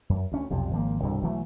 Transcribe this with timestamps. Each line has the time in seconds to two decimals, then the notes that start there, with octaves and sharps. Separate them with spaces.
0.09 F#2
0.32 D2 C#4
0.50 B1 F2 C3
0.71 G#1 F3 A#3
1.03 C2 G2 B2 D3
1.23 B1 E3 F#3 A3